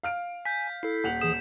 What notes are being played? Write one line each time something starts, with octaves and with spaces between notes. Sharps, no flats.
F5 F6 D7
G#5 G6 B6
E4 A4 C7
D#1 F#5 F7
E3 G#4 D#6 E7